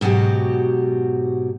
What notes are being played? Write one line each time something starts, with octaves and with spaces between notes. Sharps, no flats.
G#2 B2 F#3 F#4 G4